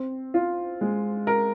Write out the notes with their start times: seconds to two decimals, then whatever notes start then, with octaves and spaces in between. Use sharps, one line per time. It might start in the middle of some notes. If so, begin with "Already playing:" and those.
Already playing: C4
0.34 F4
0.81 G#3
1.27 A#4